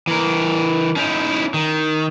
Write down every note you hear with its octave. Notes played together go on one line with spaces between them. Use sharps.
E3 A#4
C#4 D#4 E4
D#3